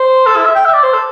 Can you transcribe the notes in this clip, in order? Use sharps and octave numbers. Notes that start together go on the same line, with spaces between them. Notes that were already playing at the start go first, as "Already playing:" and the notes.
Already playing: C5
A4
E4
E5
G5
E5
D5
C5
A4